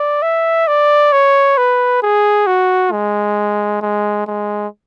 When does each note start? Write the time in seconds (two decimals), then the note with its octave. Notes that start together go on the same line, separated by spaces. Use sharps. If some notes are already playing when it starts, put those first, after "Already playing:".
Already playing: D5
0.23 E5
0.68 D5
1.13 C#5
1.58 B4
2.03 G#4
2.47 F#4
2.92 G#3
3.81 G#3
4.27 G#3